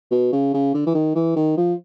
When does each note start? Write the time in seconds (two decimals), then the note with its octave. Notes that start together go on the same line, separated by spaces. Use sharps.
0.11 B2
0.33 C#3
0.54 C#3
0.74 D3
0.87 E3
0.95 D#3
1.15 E3
1.36 D#3
1.58 F3